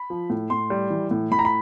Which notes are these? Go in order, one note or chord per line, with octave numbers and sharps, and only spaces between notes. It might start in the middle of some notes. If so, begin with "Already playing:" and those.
Already playing: B5
F3
A2
A2 C6
G3
E3
A2
A2 B5
A#5
B5